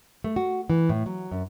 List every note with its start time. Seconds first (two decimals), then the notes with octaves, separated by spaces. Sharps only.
0.24 A3
0.36 F#4
0.70 E3
0.89 A2
1.06 F#3
1.31 F#2